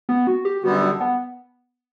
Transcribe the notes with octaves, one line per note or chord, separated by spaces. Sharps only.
B3
F#4
G4
F#2 D3 G3 B3 F#4
D4
B3